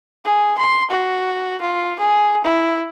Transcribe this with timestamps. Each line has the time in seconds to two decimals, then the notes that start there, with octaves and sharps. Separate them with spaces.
0.25 G#4
0.58 C6
0.91 F#4
1.61 F4
1.99 G#4
2.44 E4